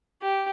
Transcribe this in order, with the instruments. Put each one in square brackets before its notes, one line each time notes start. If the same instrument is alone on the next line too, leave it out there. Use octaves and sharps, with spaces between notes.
[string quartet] G4